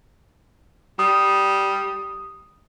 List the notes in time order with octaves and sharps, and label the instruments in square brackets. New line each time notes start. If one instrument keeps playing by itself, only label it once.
[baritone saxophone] G3 [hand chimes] D#6